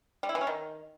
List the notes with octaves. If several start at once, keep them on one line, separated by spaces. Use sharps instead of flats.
G3
E4
E3
C#4
D#3